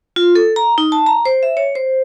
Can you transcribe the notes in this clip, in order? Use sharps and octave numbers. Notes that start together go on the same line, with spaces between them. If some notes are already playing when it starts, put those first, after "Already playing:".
F4
A4
A#5
D#4
A5
A#5
C5
E5
C#5
C5